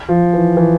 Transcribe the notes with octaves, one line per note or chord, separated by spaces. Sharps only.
F3
E3
E3